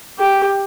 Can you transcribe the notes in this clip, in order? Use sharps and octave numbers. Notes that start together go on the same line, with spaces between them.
G4